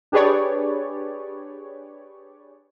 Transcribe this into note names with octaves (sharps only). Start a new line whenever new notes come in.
D4 G4 G#4 B4 C#5 D5